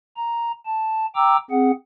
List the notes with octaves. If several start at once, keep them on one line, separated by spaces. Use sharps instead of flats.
A#5
A5
G5 A#5 D6 E6
C4 G#4 F#5